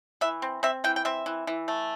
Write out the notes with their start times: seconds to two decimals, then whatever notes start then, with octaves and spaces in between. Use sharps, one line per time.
0.21 E3 E5
0.42 C4
0.63 C4 E5
0.84 E3 G5
0.96 G5
1.05 C4 E5
1.26 E3
1.47 E3
1.68 A3